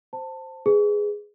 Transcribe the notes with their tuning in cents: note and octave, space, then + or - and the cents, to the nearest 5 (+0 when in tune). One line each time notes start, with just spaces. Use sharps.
C5 +0 A5 +20
G#4 +0 B4 +30